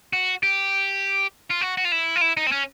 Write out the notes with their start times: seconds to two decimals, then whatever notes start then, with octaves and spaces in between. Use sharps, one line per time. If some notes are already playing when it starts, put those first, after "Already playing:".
0.13 F#4
0.43 G4
1.51 F4
1.61 F#4
1.78 F#4
1.85 F4
1.92 E4
2.16 F4
2.21 E4
2.37 D#4
2.47 C4
2.52 C#4